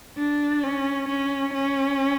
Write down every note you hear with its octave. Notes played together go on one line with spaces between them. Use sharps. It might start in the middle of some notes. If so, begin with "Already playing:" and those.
D4
C#4
C#4
C#4